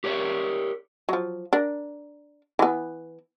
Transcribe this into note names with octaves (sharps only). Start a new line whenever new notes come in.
G4 A#4 C#5 D5
F3 F#3
D4 A#4
E3 B3